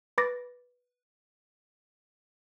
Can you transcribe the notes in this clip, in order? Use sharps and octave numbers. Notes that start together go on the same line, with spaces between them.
B4 B5 D6 A6 A#6